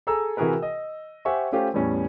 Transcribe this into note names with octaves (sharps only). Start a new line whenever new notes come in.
G#4 A4 G#5 A#5 E6
C3 E3 F#4 G#4 A#4 B4
D#5
G4 C5 E5 F#5 G#5 C#6
A3 C#4 F4 G4 C5
E2 A2 G3 C#4